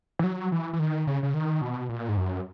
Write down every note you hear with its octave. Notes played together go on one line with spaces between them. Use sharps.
E3
F#3
E3
E3
D#3
C#3
C#3
D#3
B2
A#2
G#2
F#2